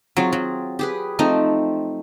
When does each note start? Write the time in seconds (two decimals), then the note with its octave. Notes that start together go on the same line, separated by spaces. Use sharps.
0.17 F#3 C4 F4 G#4
0.33 F#3
0.79 G4 G#4 B4
1.19 F3 A3 C4 D#4